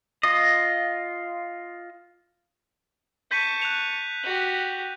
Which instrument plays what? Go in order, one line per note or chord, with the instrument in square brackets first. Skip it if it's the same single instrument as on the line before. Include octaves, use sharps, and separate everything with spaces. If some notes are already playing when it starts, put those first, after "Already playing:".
[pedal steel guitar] F4 D#5
[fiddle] A5 C#6 [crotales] G6 B6 D#7
[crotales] F#6 F7
[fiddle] F#4 G4